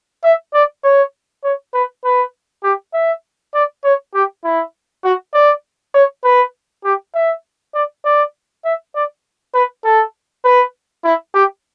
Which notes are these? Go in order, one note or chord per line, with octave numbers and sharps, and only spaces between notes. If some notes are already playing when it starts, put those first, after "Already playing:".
E5
D5
C#5
C#5
B4
B4
G4
E5
D5
C#5
G4
E4
F#4
D5
C#5
B4
G4
E5
D5
D5
E5
D5
B4
A4
B4
E4
G4